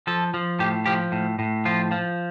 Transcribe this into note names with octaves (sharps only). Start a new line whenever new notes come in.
F3 A4
F3
A2 G4
F3 G4
A2
A2
F3 F4
F3